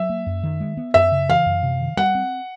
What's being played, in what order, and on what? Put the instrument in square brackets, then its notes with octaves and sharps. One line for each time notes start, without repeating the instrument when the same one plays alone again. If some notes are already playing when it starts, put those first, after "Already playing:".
Already playing: [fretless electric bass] F#3 [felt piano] E5
[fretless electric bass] A#3
F#2
D#3
G#3
B3
[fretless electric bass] F#2 [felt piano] E5
[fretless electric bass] C#3
[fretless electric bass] E3 [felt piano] F5
[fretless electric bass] F#2
C3
D#3
[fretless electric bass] G3 [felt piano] F#5
[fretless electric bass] C4